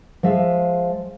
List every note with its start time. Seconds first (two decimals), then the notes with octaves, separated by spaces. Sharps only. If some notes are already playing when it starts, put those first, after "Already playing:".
0.23 F3 G#3 E5 F5